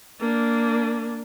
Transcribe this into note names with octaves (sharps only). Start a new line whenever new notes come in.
A#3 D4